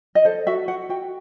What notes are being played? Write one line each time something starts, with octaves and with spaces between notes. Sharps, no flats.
D#5
A4 C5
F#4 E5
F#4 F#5
F#4 G5